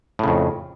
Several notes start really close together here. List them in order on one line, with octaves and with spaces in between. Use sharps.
A2 C#3 F2